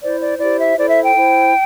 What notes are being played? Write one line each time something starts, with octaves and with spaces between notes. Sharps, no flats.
E4 C5 D5
D5
E4 G4 C5 D5
E5
E4 A4 C5 D5
E5
G5
E4 C5